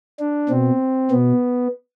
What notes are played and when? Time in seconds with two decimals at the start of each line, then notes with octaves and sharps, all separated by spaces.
0.20 D4
0.49 B2 C4
1.11 B2 B3